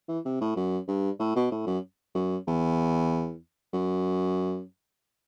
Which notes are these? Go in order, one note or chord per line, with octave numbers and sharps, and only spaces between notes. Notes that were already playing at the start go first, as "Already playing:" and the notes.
E3
C3
A2
F#2
G2
A2
B2
A2
F#2
F#2
E2
F#2